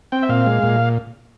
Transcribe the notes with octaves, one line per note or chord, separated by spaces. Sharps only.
C4 G5
E5
A#2 F5
G#3
A#2